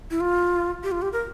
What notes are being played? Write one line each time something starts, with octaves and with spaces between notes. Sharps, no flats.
E4
F4
G4
F4
G4
A#4